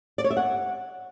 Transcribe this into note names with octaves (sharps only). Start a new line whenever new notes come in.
D5
C#5
E5
F#5